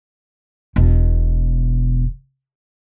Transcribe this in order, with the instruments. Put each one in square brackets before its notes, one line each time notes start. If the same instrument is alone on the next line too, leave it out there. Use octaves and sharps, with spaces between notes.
[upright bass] E1 B2